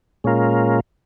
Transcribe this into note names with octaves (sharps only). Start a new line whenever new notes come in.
A#2 G#3 C#4 F4 A#4